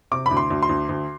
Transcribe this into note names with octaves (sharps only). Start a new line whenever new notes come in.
C3 D6
B5
D2
C6
D2
C6
D2
D2